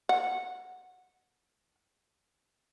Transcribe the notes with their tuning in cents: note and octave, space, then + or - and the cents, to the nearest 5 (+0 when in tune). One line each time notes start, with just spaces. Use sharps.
F#5 -15